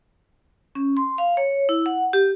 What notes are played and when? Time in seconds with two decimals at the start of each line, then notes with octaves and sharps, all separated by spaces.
0.75 C#4
0.97 C6
1.18 F5
1.37 C#5
1.69 E4
1.86 F#5
2.13 G4